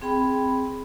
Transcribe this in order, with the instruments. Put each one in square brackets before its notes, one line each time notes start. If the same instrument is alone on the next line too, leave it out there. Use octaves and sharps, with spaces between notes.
[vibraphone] C4 G#4 G5 B5